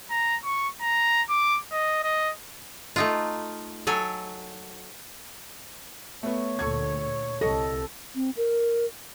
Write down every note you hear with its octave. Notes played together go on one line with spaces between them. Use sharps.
A#5
C#6
A#5
D6
D#5
D#5
A3 D#4 F4
F#3 A4 G#5
A3 B3 C#5
D2 A#2 A4 C#6 G#6
C2 A4 D#5 C#6 A#6
C4
A#4